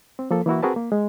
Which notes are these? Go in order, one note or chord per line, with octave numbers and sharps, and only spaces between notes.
C4
F3 A#3 A4
E3 A#3 E4 F#4
C4 F#4 G#4 A#4 B4 A5
A#3
G#3